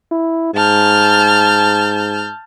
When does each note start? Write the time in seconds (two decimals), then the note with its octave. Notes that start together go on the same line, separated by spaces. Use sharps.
0.12 E4
0.54 G#2 A5 F6 G6